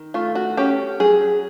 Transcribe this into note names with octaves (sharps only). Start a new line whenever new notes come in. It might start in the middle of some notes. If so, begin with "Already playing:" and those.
Already playing: D#3
A3 F4
F#4
C#4 G4
F#3 G#4